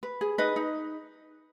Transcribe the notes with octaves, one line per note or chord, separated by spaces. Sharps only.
B4
G#4
D#4 B4 D#5
D#4